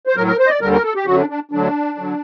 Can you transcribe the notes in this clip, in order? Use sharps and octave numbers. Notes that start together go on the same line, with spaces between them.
C5
A2 F#3 A#4
A#4
C5
D#5
D5
D#2 D3 G3 A#4
A#4
A4
G4
F#2 D3 F#3 F#4
D4
D4
D2 D3 F#3 D4
D3 F#3